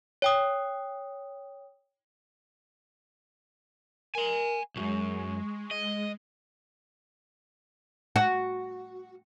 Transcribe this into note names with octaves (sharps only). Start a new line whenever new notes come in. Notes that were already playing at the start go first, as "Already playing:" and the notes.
C#5 G5 D#6
A#4 G#5 C6
B1 F#2 G#3 C#6
D#5
F#4